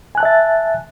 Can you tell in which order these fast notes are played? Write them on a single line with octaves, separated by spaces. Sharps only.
G#5 F#6 A5 E5 A6